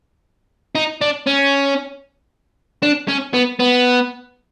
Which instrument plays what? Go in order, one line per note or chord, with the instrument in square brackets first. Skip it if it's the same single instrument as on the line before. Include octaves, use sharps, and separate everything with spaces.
[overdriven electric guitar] D#4
D4
C#4
D4
C#4
B3
B3